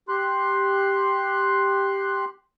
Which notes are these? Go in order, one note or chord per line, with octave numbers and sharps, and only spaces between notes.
G4 C6 F#6